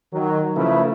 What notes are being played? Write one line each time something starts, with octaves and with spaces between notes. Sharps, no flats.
D#3 F#3
C#3 F3 A3 E4 G#4 B4